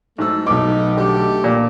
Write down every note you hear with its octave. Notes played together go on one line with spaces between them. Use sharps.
G#2 F#3 A3 E6
B1 A3 B3 D#4 D6
D3 A3 G4
A#2